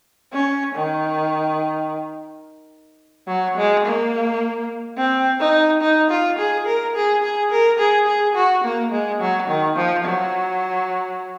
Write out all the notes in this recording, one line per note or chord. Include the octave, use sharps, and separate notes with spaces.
C#4
D#3
F#3
G#3
A#3
C4
D#4
D#4
F4
G#4
A#4
G#4
G#4
A#4
G#4
G#4
F#4
A#3
G#3
F#3
D#3
F3
F#3